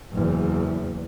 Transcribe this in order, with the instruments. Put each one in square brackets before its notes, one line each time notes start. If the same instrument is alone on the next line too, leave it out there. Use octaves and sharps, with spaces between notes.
[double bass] F#1 E2